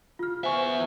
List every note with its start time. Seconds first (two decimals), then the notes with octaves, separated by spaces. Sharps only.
0.19 F4 F6
0.44 B3 C5 E5 G#5 C#6